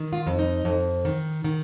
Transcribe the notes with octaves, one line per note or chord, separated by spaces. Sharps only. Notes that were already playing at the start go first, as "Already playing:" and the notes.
Already playing: D#3
F4
F2
D#4
F2
D#3
D#3